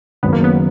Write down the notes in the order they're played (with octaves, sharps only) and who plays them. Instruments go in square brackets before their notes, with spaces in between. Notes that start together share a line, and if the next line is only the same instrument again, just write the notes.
[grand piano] F#1 F#2 D#3 [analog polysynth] B3
[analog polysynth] A#3
B3